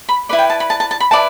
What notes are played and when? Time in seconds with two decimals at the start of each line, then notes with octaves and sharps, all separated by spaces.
0.09 B5
0.29 E4 B4 D5 B5
0.39 G5
0.50 A5
0.60 B5
0.70 A5
0.80 A5
0.91 A5
1.00 B5
1.11 E4 B4 D5 A5